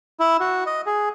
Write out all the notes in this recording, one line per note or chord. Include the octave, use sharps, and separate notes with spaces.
E4
F#4
D#5
G#4